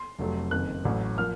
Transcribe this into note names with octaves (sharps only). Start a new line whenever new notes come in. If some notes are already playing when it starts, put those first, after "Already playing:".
Already playing: C6
F1 F2 C3 F#3 A3
F#1 F2 D#3 F#6
A1 A2 F#3
F3 A#3 F6